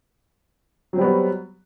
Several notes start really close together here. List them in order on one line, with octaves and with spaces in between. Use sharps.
F#3 C4 G3 B3 F#4